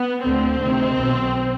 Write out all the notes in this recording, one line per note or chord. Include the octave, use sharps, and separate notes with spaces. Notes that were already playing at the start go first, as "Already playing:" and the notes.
Already playing: B3
D2 D3 C4
D2 C3 D#3
B1 B2